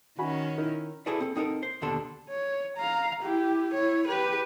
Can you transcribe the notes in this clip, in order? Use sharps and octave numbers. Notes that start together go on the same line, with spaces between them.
D#3 C#4 F#4 G#5 B5
D#4 E4 A#4
E4 F#4 G#4 A4 B4 D5
C4 A4
C4 D#4 F#4 A4 A#4
C5
D#2 B2 D3 D4 A4 C6
C#5
F5 A#5
E4 G4
E4 C#5
G4 B4